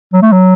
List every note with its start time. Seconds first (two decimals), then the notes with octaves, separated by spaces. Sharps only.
0.13 F#3
0.23 A3
0.32 F#3